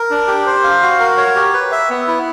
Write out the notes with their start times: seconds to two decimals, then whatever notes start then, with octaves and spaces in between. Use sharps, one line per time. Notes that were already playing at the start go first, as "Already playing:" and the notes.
Already playing: A#4
0.10 D4
0.27 G4
0.46 C5
0.64 F5
0.82 F#4
1.00 A#4
1.17 C#5
1.36 G4
1.54 B4
1.72 E5
1.90 B3
2.07 E4